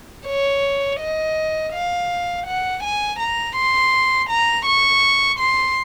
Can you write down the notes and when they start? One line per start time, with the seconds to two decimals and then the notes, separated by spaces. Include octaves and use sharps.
0.27 C#5
1.00 D#5
1.73 F5
2.47 F#5
2.83 G#5
3.20 A#5
3.56 C6
4.29 A#5
4.66 C#6
5.39 C6